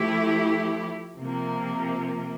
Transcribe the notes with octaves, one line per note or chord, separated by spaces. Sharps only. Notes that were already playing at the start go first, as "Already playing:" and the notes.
Already playing: F3 A3 E4 G4
C3 F3 A#3